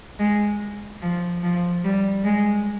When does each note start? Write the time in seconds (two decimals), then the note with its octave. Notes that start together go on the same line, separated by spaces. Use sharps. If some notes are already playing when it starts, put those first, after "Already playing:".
0.19 G#3
1.02 F3
1.43 F3
1.84 G3
2.24 G#3